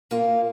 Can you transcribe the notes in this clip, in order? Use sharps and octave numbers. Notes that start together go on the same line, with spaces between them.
A#2 A#3 F4